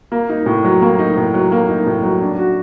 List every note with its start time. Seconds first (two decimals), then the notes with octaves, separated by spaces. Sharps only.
0.12 A#3
0.29 D#4
0.46 A2
0.64 F#3
0.82 A#3
0.99 D#4
1.17 A2
1.34 F#3
1.52 A#3
1.69 D#4
1.87 A2
2.04 F#3
2.21 D4
2.39 F#4